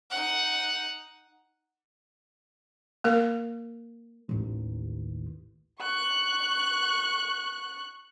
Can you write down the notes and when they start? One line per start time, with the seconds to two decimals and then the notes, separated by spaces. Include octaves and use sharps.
0.10 D#4 F#5
3.04 A#3 A#4
4.29 A1 D#2
5.81 C#6 F#6